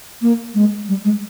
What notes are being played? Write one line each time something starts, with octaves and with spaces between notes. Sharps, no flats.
A#3
G#3
G3
G#3